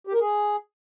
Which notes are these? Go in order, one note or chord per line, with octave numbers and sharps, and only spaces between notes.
G4
A#4
G#4